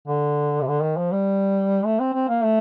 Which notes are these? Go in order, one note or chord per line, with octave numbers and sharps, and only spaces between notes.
D3
C3
D3
D#3
F3
G3
A3
C4
C4
A#3
A3